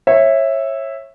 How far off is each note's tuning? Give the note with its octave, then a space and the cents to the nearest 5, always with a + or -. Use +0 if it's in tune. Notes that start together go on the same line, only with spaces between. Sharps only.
C#5 -25 E5 +0